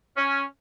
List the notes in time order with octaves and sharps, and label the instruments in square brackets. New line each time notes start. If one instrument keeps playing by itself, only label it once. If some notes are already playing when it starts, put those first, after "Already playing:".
[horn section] C#4